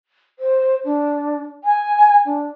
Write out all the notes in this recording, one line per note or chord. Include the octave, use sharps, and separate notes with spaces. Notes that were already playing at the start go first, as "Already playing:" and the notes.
C5
D4
G#5
D4